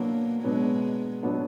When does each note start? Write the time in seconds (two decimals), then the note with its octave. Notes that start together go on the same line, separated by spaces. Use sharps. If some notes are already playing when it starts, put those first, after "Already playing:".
Already playing: B2 F#3 A#3 B3 D4
0.43 B2 F#3 G#3 B3 D4
1.23 B2 F#3 B3 D4